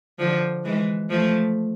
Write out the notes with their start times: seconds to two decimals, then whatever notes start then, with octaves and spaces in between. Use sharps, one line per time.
0.19 D3 F3
0.65 E3 G#3
1.10 F3 A3